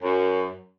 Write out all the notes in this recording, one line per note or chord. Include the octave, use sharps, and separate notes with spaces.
F#2